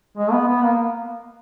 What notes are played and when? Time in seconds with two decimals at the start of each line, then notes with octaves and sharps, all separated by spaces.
0.17 G#3
0.32 B3
0.48 B3
0.63 A#3